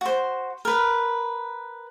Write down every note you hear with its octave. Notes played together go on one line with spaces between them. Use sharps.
F#4 C5
A#4 B4